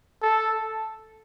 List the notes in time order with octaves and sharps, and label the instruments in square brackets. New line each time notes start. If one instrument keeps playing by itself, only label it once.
[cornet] A4